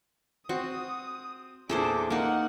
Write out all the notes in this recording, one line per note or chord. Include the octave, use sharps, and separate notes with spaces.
C4 F#4 D#6
E2 A#2 E3 D4 G#4 A4 C5 D6
A#3 D#4 F#5